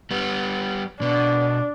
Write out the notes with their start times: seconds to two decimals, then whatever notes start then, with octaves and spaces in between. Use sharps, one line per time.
0.11 G3 B3
1.02 B2 D4